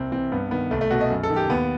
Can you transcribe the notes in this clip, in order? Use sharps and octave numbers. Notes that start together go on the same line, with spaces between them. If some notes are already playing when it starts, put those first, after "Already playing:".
Already playing: C2 C4
C3 E3 C4
G2 B3
D#3 B3
C2 A3
A3
B2 F#4
D#5
F#2
A4
D#3
G4
D#2 B3